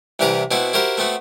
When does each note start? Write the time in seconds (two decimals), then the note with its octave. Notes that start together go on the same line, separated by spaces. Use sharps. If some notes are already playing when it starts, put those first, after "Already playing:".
0.19 C2 C3 E3 G4 B4 A#5
0.51 B2 C4 E4 F#4
0.73 E4 F#4 G4 A#4 C5
0.97 A3 B3 C4 F#4